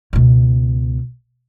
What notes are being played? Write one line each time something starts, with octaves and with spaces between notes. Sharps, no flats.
C#2 B2